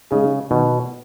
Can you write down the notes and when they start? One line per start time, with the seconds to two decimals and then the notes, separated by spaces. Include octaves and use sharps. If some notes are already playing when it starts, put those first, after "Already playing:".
0.11 C#3 G#3 D#4 G#4
0.51 B2 D#3